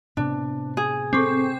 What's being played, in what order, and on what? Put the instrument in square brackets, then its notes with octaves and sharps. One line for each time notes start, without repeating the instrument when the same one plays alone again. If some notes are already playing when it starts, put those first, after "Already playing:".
[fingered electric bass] A2 C3 B3 [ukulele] D4
[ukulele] G#4
[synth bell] C4 [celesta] A4 C#6 D6